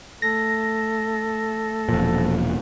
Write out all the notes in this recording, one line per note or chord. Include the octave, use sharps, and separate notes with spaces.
A3 A4 A#6
E1 A#2 F3